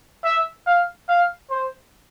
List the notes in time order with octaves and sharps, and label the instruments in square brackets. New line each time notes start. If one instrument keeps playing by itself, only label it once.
[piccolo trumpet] E5
F5
F5
C5